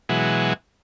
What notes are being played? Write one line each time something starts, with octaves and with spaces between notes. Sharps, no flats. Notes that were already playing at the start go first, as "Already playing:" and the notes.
B2 E3 F#3 G#3